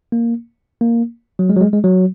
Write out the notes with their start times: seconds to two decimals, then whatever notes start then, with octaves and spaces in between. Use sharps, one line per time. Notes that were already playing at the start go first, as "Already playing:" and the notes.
0.12 A#3
0.81 A#3
1.39 F#3
1.50 G#3
1.56 F#3
1.61 G#3
1.73 G#3
1.84 F#3